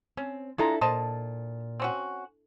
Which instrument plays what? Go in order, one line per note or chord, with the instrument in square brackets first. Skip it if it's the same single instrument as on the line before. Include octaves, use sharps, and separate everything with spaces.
[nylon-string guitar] C4 [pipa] C#4
[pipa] G#3 F4 A#5 [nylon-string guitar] D4 E4 A4
[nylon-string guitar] A#2 [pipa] C5 D#5 A5
[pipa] C4 C#4 F#4